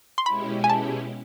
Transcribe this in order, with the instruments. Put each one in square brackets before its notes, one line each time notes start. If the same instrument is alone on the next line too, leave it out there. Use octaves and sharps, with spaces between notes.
[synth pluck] C6
[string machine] B2 G#3 C#4 E4 G4 [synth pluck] B5
[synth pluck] G#5
A5